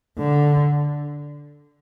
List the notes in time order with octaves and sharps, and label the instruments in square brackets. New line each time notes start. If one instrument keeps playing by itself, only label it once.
[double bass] D3